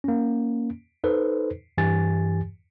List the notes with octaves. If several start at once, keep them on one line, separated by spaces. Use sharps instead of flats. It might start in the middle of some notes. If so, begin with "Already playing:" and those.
A#3 C#4
D#4 A4 B4 C5
G2 E3 G4 G#5 A6